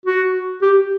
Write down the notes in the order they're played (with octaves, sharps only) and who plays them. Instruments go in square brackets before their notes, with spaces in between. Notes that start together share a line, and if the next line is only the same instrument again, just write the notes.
[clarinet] F#4
G4